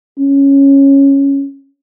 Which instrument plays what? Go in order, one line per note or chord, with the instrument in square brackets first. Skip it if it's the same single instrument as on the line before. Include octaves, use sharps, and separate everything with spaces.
[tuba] C#4